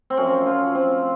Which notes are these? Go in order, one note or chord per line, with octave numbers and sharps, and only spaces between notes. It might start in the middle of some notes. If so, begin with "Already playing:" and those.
C4
F#2 F3 C#4
F4
C4